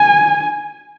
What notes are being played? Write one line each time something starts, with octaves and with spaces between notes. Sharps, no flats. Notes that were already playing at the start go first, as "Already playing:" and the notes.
Already playing: G#5